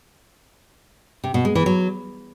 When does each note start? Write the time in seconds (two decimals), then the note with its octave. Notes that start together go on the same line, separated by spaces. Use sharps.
1.24 C3
1.34 B2
1.45 G#3
1.55 E3
1.66 F#3